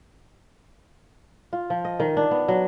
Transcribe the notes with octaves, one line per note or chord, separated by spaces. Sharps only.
F4
F3
D#5
D#3
D4
B3
F#3